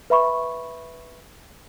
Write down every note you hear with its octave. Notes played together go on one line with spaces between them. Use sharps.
B4 E5 B5 C#6